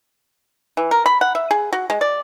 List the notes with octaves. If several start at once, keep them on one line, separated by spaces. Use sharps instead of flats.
E3
A#4
B5
F#5
E5
G#4
F#4
G#3
D5